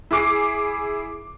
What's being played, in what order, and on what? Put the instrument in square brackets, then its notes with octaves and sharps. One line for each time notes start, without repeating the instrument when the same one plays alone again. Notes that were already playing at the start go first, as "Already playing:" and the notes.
[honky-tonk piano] E4 G#4 D6 C7 D7